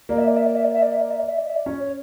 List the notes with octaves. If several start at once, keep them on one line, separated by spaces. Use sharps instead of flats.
A#3 D5
E5
D5
E5
D5
E5
D5
E5
D5
E5
D5
E5
D5
E5
D5
E5
D5
C#4
C#5